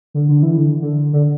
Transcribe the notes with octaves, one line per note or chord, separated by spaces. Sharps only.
D3
D3
E3
D3
D3
D3